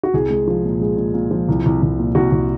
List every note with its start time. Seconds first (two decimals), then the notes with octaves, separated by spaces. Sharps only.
0.03 F#4
0.13 C2 G#4
0.30 G#3
0.47 F3
0.64 A#2
0.81 G#3
0.97 A#2
1.14 A#2
1.31 F3
1.48 C2
1.66 C2
1.82 C2
1.99 A#2
2.15 C2 F#4
2.32 C2